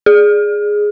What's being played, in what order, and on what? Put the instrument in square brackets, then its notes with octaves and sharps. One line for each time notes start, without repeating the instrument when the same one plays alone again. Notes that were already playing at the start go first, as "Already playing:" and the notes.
[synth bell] G#4